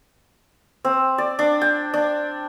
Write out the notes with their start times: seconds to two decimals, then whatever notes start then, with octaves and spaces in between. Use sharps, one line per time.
0.85 C4
1.18 D5
1.39 D4
1.61 G5
1.94 D4